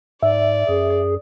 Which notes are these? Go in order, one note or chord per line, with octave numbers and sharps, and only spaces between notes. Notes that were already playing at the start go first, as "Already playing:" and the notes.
G#2 D5 E5
F#2 G#4